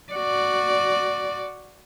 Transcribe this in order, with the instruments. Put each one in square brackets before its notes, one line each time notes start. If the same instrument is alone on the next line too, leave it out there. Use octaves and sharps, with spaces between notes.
[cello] F#4 D5